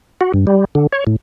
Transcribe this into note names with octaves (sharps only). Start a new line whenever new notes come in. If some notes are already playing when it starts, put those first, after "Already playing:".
F#4
G2
G3
D3
C#5
A2